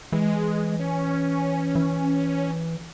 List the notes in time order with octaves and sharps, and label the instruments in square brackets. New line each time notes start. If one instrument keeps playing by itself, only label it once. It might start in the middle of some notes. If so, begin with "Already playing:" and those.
[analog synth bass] E3 [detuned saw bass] G#3
[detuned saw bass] C#4
C#4
[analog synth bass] E3